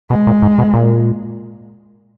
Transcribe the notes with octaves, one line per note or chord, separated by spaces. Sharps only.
B2 G#3
A#2
G#2
B2
A#2